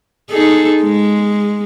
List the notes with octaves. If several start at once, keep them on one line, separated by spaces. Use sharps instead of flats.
D#4 G#4 A4
G#3